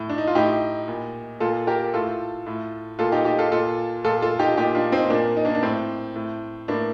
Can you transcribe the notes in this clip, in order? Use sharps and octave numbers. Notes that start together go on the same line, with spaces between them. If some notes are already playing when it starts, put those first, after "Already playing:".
Already playing: A2
D4
D#4
F4
A2 D#4 G4
A#2
A#2 F4 A4
G4 A#4
A2 F4 A4
A2
A#2 F4 A4
D#4 G4
D#4 G4
F4 A4
A#2 F4 A4
A#2 F4 A4
F4 A4
D#4 G4
A#2 D#4 G4
D4 F4
C4 D#4
A#2 A#3 D4
D#4
A#3 D4
D4
A2 C4
A2
A2 A#3 D4